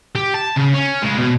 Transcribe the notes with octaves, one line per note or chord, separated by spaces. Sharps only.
G4
A5
C#3
C#4
C#2 G#3
B2